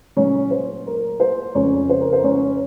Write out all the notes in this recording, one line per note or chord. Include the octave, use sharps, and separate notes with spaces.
A#2 F#3 A3 C#4 C#5
C5
A#4
C5
F2 C#3 A3 C#4 C#5
C5
A#4
C5
C#4 C#5